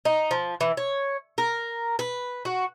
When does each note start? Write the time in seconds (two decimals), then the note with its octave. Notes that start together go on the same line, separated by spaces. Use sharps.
0.05 D#4
0.31 F3
0.61 E3
0.77 C#5
1.38 A#4
1.99 B4
2.45 F#4